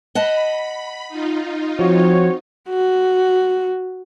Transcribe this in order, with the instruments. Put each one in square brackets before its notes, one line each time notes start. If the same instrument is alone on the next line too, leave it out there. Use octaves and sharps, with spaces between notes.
[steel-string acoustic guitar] D#5 F#5 A5 [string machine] B5
[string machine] D#4 F4
[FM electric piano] F3 [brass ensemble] C4 F#4 C#5
[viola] F#4